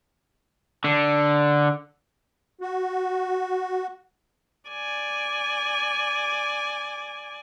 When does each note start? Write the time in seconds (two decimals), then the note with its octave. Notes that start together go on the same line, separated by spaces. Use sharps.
0.84 D3
2.61 F#4
4.70 D5 G#5